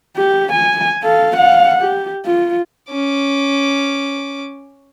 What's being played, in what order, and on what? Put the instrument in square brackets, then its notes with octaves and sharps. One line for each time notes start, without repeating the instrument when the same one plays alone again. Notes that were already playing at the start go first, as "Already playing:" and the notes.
[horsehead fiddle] G4
G#5
A4 F5
F5 F#5
G4
F4
[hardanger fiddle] C#4 D6